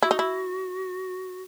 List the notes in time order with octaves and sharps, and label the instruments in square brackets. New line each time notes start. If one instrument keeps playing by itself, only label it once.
[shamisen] E4 [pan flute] F#4
[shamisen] D#4
E4